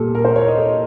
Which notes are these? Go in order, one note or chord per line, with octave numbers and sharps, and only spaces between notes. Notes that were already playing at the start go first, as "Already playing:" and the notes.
Already playing: A#2 G3 A4
A#4
C5
C#5
D#5
A4